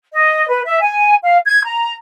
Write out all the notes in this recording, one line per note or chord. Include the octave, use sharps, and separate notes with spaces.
D#5
B4
E5
G#5
F5
G#6
A#5